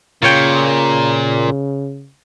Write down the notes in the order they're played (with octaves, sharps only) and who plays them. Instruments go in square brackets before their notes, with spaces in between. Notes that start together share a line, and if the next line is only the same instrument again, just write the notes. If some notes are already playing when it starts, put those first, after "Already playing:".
[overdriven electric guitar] A#2 [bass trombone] C#3 [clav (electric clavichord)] F4 C#5 G5